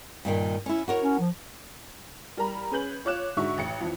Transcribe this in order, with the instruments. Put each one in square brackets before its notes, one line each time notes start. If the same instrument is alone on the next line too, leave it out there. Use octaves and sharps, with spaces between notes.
[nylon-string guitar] G2 A#2 D#3
C#4 E4
F#4 A#4 C#5
[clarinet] C#4
F3
[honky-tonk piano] G3 A#4 A#5 B5
C#4 G#4 B4 G6 F#7
F4 C#5 D6 F#6 E7
G#2 D3 F#4 E5 C#6
A1 C#7
F2 E3 F3